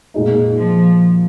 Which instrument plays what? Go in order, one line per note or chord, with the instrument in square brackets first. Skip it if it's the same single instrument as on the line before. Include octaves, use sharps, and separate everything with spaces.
[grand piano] A#2 G#3 D#4
[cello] F3